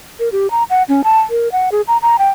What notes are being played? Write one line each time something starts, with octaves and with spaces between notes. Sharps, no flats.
A#4
G4
A#5
F#5
C#4
A5
A#4
F#5
G#4
A#5
A#5
G5